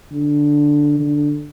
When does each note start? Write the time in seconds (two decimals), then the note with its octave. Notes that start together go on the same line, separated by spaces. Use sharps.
0.11 D3
1.00 D3